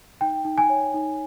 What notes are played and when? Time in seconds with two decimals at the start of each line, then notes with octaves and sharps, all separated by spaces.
0.21 D#4 G5
0.45 D#4
0.58 G#5
0.70 C#5
0.94 D#4